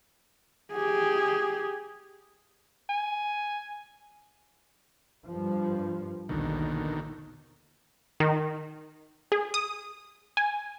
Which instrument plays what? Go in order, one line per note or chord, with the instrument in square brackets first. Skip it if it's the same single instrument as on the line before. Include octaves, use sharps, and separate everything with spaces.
[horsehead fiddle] G4 G#4
[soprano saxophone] G#5
[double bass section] G2 F3
[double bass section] A#1 D#2 [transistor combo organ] B2 D3 D#3
[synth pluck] D#3
G#4
D#6
G#5